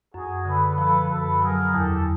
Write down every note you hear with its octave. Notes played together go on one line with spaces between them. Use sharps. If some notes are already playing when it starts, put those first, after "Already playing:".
F#2 F#4 G#4
D3 A4 B4
F3 A4 B4
F#2 A4 B4
F#3 G#4 A#4
E2 G4 A4